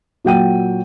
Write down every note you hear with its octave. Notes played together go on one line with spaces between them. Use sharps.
A#2 F#3 G5 D#7